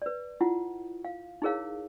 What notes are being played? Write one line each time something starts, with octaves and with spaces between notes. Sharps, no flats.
B4 D5
E4 F4 F#5
F5
D#4 E4 G#4 A#4 C#5 F5